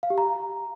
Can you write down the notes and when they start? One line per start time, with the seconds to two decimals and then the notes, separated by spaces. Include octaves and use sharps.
0.03 F5
0.10 G4
0.18 A#5